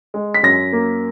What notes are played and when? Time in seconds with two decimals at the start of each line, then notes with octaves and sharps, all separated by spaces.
0.14 G#3
0.34 B6
0.43 F#2 A#6
0.73 A#3